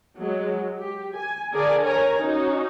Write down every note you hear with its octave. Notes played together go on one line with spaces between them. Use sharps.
F#3 G#3
G4
G#5
D3 G#4 A#4 D5 G#5
A#4 C#5 G#5 A#5
C#4 D#4 F#4